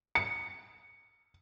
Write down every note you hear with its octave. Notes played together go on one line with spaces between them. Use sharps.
C#7